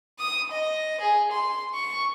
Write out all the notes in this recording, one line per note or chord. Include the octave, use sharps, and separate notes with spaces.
D#6
D#5
G#4
C6
C#6